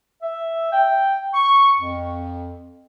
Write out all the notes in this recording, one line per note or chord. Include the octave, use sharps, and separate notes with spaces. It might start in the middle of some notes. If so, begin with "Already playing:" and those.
E5
G5
C#6
F2